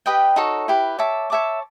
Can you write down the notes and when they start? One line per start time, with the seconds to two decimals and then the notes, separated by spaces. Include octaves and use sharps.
0.06 G4 B4 D#5 G5
0.36 D#4 F#4 A4 C#5
0.68 E4 G4 B4
0.99 C#5 E5 A5 D6
1.30 C#5 E5 A5 D6